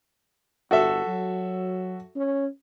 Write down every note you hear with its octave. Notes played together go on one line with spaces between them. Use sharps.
G1 F#4 A4 E5
F#3
C#4